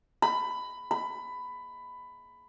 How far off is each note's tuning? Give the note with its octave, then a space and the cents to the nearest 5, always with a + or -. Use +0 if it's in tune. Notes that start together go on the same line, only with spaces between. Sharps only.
B5 +15
B5 +15